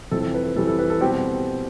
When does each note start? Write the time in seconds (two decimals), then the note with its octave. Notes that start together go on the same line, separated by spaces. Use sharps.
0.11 F2 C3 E3 G3 A4
0.22 A4
0.34 B4
0.45 A4
0.56 F2 C3 E3 G3 A4
0.67 A4
0.79 B4
0.90 A4
1.01 B2 G3 C4 G4